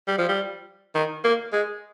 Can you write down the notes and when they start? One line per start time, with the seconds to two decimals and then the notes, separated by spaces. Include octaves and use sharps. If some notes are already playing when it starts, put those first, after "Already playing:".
0.08 G3
0.18 F3
0.29 G3
0.95 D#3
1.24 A#3
1.53 G#3